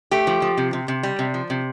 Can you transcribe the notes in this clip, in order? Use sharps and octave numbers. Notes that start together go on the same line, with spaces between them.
A3 G4
F3
F3
C3
C3
C3
G3
C3
F3
C3